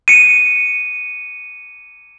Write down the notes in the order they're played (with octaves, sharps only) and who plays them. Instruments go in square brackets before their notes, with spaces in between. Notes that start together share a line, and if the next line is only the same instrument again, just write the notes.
[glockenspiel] C#7 D#7